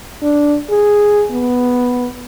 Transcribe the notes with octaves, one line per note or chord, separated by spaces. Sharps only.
D4
G#4
B3